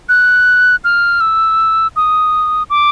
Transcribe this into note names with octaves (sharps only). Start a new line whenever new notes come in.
F#6
F6
E6
D#6
D6